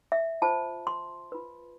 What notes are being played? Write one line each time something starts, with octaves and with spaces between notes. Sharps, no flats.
E5
F4 C5 A5
C6
F4 B4